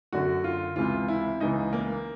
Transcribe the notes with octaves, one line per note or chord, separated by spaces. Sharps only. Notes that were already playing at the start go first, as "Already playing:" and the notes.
F#2 D3 F#4
F4
C#2 C3 E3 F4
E4
C#2 C#3 E3 D#4
A#3